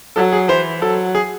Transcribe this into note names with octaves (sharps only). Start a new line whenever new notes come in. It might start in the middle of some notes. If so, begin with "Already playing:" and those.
F#3 A4
G#4
E3 C5
F#3 A4
G#4